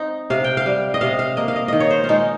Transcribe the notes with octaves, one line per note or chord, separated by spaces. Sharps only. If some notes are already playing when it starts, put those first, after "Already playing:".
Already playing: C4 D#4
C3 F5
G5
F5
G3
D#5
C3 F5
F5
A#3 D#5
F5
D#5
D#3 D#5
C#5
C5
F4
G#3 D#4